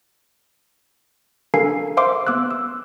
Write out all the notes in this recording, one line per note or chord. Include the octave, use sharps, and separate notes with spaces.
D4 A4 A#4 F5 G#5 C7
C5 E5 F5 C6 D6
B3 D6 E6 F#6
E6